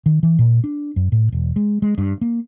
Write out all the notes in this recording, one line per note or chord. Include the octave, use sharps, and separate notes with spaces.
D#3
E3
A#2
D4
F#2
A2
E1
G#3
G#3
G2
A#3